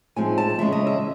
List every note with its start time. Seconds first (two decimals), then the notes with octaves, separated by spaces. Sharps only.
0.16 A2 F3 G#3 C4 D#4 G#5
0.38 A5
0.59 C#3 E3 G#3 C#4 E5
0.72 D#5
0.87 E5